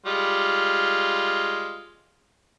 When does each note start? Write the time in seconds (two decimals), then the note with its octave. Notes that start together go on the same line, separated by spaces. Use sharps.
0.06 G3 G#3 F4